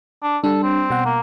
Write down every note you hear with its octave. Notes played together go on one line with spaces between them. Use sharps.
D4
G3 D4 A4
C4
B2 F#5
A#3